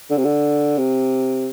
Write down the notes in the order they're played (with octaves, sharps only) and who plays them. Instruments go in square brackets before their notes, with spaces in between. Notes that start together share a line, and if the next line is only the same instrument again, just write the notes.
[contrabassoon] D3
C3
D3
C3